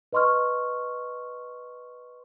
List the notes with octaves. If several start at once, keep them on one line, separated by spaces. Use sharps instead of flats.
B4 D#5 C6 C#6 F6